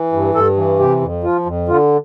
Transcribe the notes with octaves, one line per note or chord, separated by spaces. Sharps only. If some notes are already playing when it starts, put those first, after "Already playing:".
Already playing: E3
G2
G2 A4
E3
C3 G4
F2
F3 F4
F2
D3 F4